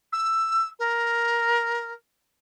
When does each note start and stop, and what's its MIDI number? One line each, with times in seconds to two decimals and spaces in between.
0.13 0.68 88
0.79 1.92 70